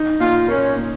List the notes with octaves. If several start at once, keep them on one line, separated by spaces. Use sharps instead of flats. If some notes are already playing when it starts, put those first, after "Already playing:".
Already playing: D#4
A#2 F4
A#3 C#4
A#2